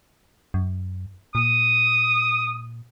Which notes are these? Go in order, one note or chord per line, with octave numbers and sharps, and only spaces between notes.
F#2
A#2 D#6